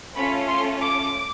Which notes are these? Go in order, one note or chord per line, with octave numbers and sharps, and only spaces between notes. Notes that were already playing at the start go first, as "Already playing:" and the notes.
A3 C#4 F4 A4 B5
C6
D6